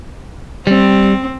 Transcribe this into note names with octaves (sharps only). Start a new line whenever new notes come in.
G3 C4